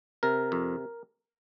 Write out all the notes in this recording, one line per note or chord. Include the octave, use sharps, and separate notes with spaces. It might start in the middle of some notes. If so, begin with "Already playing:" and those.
C3 A#4
F2